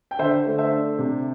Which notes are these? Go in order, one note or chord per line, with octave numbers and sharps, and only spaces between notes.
G5
D3 C5 E5
A3
C5 E5
D4
C3